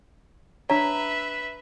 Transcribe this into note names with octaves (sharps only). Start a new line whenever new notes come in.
D4 B4 C#5 E5 A#5